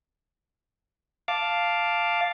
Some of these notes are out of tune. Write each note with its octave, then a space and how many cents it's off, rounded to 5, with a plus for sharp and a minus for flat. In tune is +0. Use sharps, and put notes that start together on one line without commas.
F5 +0 A5 +0 D6 +0